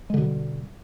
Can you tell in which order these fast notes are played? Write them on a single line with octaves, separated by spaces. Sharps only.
G#3 D3 B2 G3